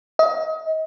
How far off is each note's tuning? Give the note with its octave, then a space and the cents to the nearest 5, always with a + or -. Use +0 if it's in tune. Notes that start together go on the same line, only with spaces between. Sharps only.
D#5 +35